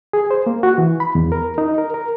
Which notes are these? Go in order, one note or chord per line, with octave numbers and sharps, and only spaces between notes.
G#4
C5
A#3
F#4
E3
B5
E2
A#4
D#4
A#4
A#4